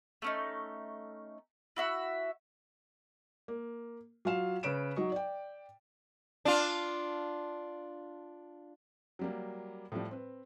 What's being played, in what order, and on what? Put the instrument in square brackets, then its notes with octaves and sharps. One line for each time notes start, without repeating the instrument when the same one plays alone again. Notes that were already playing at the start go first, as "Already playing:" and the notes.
[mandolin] A3 C#4 D#4
E4 F#4 E5 F#5
[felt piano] A#3
F#3 F4 F5 E7
C#3 B4 C#5 D7 E7
F#3 D#4 D#5 C#6
D5 G5
[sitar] D4 F4
[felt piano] F#3 G3 A#3
A2 F3 G3
C4 B4